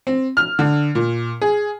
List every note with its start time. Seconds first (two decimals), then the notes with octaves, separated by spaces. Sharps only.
0.07 C4
0.37 F6
0.59 D3
0.95 A#2
1.42 G#4